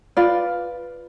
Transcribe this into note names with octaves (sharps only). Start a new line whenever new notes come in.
F4 B4 D5